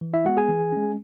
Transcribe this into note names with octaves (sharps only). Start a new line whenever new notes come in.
E3
E4 E5
G#3 B3 F#4 F#5
G#4 G#5
E3
G#3 C#4